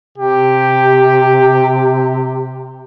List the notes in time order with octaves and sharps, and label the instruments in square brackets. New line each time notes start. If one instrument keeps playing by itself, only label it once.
[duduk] C3 [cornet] G4